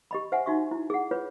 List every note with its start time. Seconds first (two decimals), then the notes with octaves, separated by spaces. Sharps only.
0.11 G4 D#5 B5
0.32 C5 E5 F#5 G#5
0.46 D#4 F#4 E5 C#6
0.71 E4
0.90 G#4 F#5
1.11 F4 B4 C#5